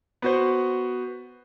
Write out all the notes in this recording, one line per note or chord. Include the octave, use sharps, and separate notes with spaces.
B3 F#4 C5